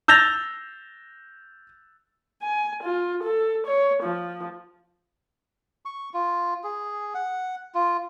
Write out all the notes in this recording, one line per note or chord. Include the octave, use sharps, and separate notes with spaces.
E6 G6 A6 A#6 F7
G#5
F4
A4
C#5
F3
C#6
F4
G#4
F#5
F4